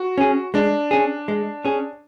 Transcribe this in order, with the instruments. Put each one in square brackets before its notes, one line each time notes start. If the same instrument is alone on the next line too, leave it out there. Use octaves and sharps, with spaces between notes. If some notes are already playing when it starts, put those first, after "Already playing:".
Already playing: [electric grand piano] F#4
[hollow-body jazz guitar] C#4 G#4
[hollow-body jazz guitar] G#3 [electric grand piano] D4
[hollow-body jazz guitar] C#4 G#4
G#3
C#4 G#4